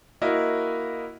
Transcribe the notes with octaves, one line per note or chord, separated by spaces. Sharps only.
A#3 E4 F#4 A#4 D#5